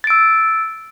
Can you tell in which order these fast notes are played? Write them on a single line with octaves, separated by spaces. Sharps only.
A6 D7 E6